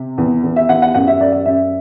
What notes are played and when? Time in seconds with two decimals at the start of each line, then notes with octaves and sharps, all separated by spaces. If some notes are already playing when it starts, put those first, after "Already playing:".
Already playing: C3
0.18 E2
0.43 E2
0.56 E5
0.69 E2 F#5
0.82 F#5
0.94 F#2 F#5
1.07 E5
1.20 F#2 D5
1.32 E5
1.45 F#2 E5